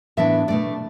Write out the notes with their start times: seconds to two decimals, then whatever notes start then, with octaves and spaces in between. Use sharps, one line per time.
0.17 A2 E3 B3 D4 E5
0.48 B2 A3 D4 D5